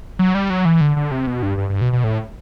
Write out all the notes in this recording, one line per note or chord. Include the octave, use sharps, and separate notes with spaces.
F#3
G3
F#3
E3
D3
D3
C3
B2
G2
G2
G2
B2
B2
A2